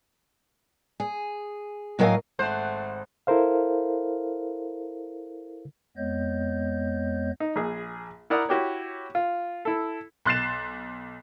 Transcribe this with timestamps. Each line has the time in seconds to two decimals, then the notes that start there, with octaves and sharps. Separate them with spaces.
1.00 G#4
1.99 A2 F#3 A#4 D#5 F5 G#5
2.39 G#1 A3 C5 F#5 C6 F#6
3.27 E4 A4 A#4 C5 F5
5.97 F2 G#3 B3 C#5 D#5 G6
7.40 D#4
7.56 A#1 G#4
8.30 E4 A#4 D5 F#5 A#5 D#6
8.49 E4 F#4 G4 C#5
9.15 F4
9.65 E4 A4
10.25 B1 C6 F#6 A6 C7 E7